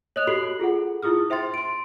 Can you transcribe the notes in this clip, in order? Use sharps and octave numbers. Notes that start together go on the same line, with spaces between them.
C#5 D#5 D#6 F#6 F7
F#4 G4 A4 B5 C7 F#7
F4 G#4 A4 F#5
E4 F4 G#4 D#6 F6
C5 E5 G5 C6 A6
C6 D7